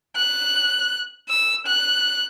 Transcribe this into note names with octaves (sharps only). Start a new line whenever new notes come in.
F#6
E6
F#6